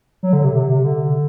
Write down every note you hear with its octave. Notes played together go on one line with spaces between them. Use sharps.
F#3
D3
C3
C3
C3
D3